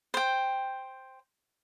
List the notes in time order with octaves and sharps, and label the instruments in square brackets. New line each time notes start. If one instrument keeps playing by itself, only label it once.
[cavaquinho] C5 G5